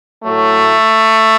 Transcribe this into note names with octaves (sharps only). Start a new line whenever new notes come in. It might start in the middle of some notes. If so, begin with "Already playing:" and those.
A2 F#3 A3